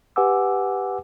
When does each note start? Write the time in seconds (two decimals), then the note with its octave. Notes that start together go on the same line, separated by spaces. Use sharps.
0.16 G4 B4 F#5 G#5 D6 E6